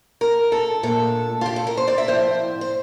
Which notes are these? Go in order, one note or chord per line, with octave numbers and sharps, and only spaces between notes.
A#4
A4
A#2 A3 D4 A4
F4
G4
A4
A#4
C5
D5
E5
A2 F3 C4 C5
C5